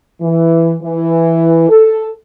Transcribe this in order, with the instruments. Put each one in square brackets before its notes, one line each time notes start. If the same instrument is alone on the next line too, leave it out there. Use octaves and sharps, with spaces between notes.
[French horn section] E3
E3
A4